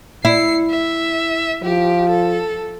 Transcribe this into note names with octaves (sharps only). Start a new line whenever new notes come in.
E4 C7 C#7
E5
F3 G4
A4